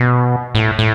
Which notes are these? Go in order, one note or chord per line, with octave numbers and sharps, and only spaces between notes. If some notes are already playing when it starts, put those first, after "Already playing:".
Already playing: B2
A2
A2